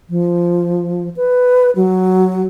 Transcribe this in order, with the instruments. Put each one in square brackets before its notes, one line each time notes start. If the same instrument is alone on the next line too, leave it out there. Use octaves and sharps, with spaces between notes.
[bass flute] F3
B4
F#3